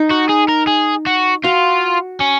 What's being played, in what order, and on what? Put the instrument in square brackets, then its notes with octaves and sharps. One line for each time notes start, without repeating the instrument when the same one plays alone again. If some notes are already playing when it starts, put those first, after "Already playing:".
Already playing: [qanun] D#4
[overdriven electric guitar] F#4
G#4
A#4
G#4
F#4
[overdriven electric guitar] F4 [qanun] F#4
[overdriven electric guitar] C#4